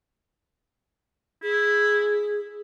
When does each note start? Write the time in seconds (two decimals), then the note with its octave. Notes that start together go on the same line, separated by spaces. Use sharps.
1.43 E4 G#4